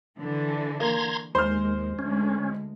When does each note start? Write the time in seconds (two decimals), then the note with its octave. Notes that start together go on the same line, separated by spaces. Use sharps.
0.17 D3 E3
0.80 A#3 A#5 C6 G#6
1.35 D#2 G#3 C5 F6
1.99 D2 G#3 C#4